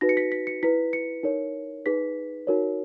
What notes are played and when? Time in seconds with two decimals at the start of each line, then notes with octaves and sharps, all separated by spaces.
0.01 D#4 F#4 B4 A#6
0.09 C#7
0.17 B6
0.32 B6
0.47 C#7
0.63 E4 B4 B6
0.93 C#7
1.23 D#4 A#4 C#5
1.86 D#4 G#4 B4 B6
2.47 D#4 F#4 A#4 C#5